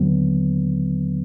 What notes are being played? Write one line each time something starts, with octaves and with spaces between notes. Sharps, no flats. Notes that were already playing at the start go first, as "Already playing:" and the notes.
Already playing: D#2 D3 F#3 B3